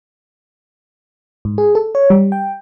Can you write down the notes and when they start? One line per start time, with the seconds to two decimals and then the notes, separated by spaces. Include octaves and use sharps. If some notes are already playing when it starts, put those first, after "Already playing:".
1.45 G#2
1.58 G#4
1.75 A4
1.95 C#5
2.10 G3
2.32 G5